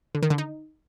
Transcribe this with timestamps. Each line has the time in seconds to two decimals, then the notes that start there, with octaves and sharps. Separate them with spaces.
0.15 D3
0.23 D#3
0.30 D3
0.38 D#4